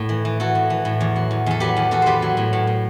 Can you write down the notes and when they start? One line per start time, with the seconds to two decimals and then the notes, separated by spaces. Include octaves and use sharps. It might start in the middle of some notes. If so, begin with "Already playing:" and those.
Already playing: A2
0.09 E3
0.25 E3
0.40 E3 F#4 A4
0.55 A2
0.70 E3
0.85 A2
1.01 E2
1.16 F#3
1.31 E2
1.46 E2 A4
1.60 F#3 G4 B4
1.77 E2
1.91 E2 F#4 A4
2.02 E2 G4 B4 C5
2.22 F#3
2.37 A2
2.53 A2
2.67 A2